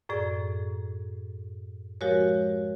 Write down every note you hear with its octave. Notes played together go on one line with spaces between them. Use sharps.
F#2 A2 G#4 D5
F3 G#3 F#4 G4 A#4 C#5